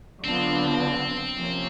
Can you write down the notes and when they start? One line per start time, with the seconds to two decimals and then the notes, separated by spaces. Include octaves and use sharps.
0.24 D3 F#3 B3 C4 D4 F4
1.35 C3 F3 A#3 C#4